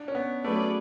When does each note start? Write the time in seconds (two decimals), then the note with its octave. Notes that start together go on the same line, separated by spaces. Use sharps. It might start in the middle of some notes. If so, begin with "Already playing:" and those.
Already playing: D4
0.08 C#4
0.15 B3
0.44 F#3 A3 C#4 G#4 B4 D5